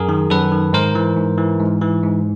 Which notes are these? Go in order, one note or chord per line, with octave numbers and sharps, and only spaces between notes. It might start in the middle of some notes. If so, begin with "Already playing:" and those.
Already playing: F#2 G#4 A#4
D#3
F#2 A4 B4
D#3
G#2 A#4 C5
E3
G#2
E3
G#2
E3
G#2